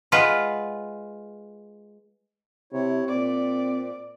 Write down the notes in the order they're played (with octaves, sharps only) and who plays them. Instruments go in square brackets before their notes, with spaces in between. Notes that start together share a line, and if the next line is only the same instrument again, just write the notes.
[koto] G#3 F4 B4 F#5
[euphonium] C3 [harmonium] E4 C#5
[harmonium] A#2 [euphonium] C4 [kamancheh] D5